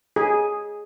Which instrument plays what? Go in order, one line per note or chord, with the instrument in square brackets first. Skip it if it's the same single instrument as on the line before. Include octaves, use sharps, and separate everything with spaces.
[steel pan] G#4